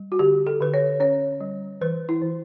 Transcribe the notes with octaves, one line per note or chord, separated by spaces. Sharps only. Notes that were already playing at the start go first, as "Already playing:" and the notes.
Already playing: G3
F#4
D3 G4
A4
D3 B4
C#5
C#4 C#5
G3
E3 B4
E4
E3